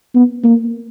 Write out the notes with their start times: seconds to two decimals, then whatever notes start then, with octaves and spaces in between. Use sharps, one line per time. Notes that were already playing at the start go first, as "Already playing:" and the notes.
0.15 B3
0.44 A#3